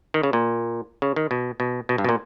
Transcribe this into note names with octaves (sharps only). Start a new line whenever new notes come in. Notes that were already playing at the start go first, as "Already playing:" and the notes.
D#3
C#3
A#2
C#3
D#3
B2
B2
B2
G2
B2
A#2